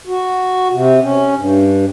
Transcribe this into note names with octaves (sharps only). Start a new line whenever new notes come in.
F#4
C3
C#4
G2